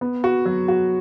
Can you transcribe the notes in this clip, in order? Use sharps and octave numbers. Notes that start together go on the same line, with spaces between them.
B3
F#4
F#3
F#4